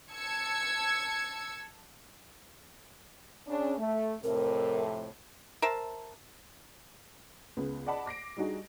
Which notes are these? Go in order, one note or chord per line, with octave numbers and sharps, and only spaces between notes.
A5 E6 G#6 C#7
C#3 C#4 D4
A3
F2 A2 C3 A#4
A#4 C5 E5 A5
C#2 B3
D5 D#5 F#5 A5 B5
D6 A#6 C7 D7
G3 D4 D#4 F#4 G#4